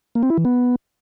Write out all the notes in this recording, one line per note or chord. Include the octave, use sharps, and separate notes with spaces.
A#3
C4
E4
E3
B3